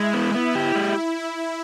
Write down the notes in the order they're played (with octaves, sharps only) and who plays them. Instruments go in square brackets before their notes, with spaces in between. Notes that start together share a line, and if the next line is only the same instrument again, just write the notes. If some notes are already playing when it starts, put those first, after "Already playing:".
Already playing: [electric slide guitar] G#3 [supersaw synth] E4
[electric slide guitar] B3
B3
G4
G#3